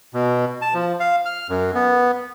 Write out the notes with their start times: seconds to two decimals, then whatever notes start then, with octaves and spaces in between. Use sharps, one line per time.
0.14 B2
0.62 A5
0.74 F3
1.00 F5
1.25 F6
1.49 F#2
1.75 B3